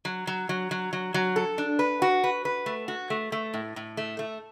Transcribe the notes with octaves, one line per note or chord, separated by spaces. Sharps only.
F#3
F#3
F#3
F#3
F#3
F#3
A4
D4
B4
F#4
B4
B4
A3
F#4
A3
A3
A2
A2
A3
A3